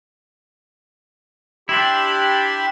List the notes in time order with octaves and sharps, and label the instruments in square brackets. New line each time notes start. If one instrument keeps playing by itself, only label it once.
[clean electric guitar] D4 E4 [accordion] G4 B5 C6